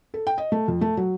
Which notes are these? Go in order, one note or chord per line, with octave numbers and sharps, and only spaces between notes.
A4
G5
D#5
A3
F2
A3
F#3